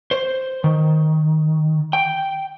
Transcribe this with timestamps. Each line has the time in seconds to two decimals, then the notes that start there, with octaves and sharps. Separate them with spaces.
0.11 C5
0.64 D#3
1.93 G5